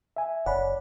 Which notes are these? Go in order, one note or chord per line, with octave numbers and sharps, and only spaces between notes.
E5 G#5
F#1 C#5 D5 F#5 B5